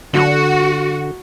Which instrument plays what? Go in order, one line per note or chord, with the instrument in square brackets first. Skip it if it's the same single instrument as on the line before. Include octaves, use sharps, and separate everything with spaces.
[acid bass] D3 [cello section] F#4